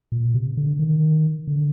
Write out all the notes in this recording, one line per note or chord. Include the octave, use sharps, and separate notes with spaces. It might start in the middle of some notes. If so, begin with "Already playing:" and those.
A#2
C3
D3
D#3
D3